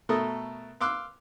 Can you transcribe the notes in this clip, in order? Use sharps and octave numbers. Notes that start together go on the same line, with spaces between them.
B2 A3 A4 A#4 D#6
F5 C6 D6 E6 F#6